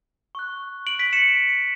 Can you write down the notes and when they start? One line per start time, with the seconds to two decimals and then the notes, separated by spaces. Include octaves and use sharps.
0.35 C#6 F#6
0.87 D7 F#7
0.99 B6 D7
1.13 C#7 E7